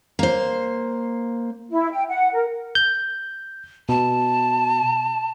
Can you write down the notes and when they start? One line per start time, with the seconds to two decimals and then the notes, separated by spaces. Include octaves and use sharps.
0.19 A#3 C5
1.71 E4
1.93 G5
2.08 F#5
2.33 A#4
2.75 G6
3.89 B2 A5